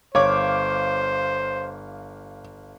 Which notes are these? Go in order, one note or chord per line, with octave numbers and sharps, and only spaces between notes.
G1 C5 C#5 F5 D6